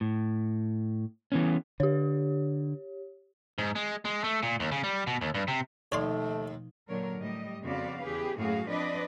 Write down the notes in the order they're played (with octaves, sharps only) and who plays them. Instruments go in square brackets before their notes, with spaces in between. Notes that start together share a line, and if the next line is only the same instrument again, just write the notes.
[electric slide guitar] A2
E3 B3 C#4
[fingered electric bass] D3 [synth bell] G4 C#5
[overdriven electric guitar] G#2
G#3
G#3
A3
A#2
D#2
C#3
G3
B2
D#2
G2
C3
[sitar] D#2 [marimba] B2 F3 D#4 [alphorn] A3 [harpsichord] C#5 D5 C6
[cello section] A#2 D3 F#3 A#4 C#5
A2 G3 D#5
F2 C#3 B3 F#4 D5 F5
E2 G4 G#4 B4
F#2 A2 A#3 F#4 G#4 F5
F3 C4 D4 B4 D5 D#5